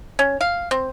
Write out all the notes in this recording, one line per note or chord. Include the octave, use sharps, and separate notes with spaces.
C#4
F5
C4